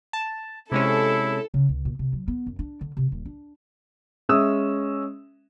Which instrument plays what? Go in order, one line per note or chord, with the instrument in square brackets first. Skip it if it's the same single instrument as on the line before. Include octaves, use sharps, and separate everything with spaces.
[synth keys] A5
[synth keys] C3 G#3 C#4 [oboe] E4 [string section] A4
[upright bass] C#3
C#2
A#2
C3
F#3
B3
F#2
D4
D3
C3
D#1
D4
[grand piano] G#3 C#4 E5 D#6 E6